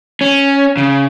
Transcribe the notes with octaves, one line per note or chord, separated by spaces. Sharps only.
C#4
C#3